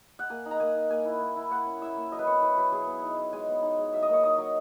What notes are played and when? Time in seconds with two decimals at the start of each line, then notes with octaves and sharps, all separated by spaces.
0.19 F#5
0.30 A#3 G#5
0.46 D#4
0.51 A#5
0.60 A#3 G#5
0.75 D#4
0.91 A#3 G#5
1.05 E4
1.21 A#3
1.36 E4
1.51 A#3 F#5
1.66 C#4
1.81 E4 E5
1.96 A#3
2.12 F#3 D#5
2.19 B4
2.27 B3 C#5
2.42 E4 B4
2.58 F#3 B4
2.72 F#3 G#4
2.87 B3
3.02 D#4
3.18 F#3
3.33 G#3 G#5
3.48 B3
3.63 D#4
3.78 G#3
3.93 F#3 E5
4.03 D#5
4.09 A#3 C#5
4.23 D#4 D#5
4.38 F#3